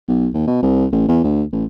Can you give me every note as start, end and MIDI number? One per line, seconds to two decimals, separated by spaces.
0.08 0.28 35
0.34 0.46 39
0.47 0.58 47
0.63 0.86 36
0.92 1.05 33
1.08 1.19 40
1.24 1.43 38
1.53 1.64 33